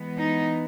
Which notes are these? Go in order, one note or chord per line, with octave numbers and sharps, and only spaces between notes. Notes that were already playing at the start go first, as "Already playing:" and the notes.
Already playing: E3 G#3 B3
D#4